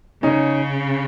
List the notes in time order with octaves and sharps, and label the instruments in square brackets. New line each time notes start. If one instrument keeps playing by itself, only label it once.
[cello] C#3 [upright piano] C#4 D#4